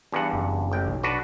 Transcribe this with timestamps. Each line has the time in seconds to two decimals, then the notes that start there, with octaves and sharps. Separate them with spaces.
0.12 E2 G2 F#5
0.33 F#1
0.72 A1 G5
0.87 B1
1.03 D4 F#4 B4